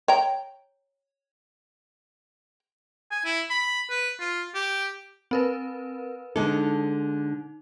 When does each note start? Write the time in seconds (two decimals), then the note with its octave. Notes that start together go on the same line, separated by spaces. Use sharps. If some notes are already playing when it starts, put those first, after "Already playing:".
0.08 C#5 G5 A#5
3.11 G#5
3.25 E4
3.50 B5
3.90 B4
4.20 F4
4.54 G4
5.31 C4 A#4 B4
6.36 D3 G#3 D#4 A4